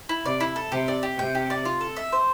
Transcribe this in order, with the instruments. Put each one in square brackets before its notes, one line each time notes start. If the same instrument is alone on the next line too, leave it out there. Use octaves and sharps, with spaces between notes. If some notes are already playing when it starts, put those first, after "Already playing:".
[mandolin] E4
[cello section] C3 [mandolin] D5
[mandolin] E4
A4
[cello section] C3 [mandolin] G4
[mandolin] D5
G4
[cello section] C3 [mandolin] G5
[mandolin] G4
D5
F4
A4
E5
C5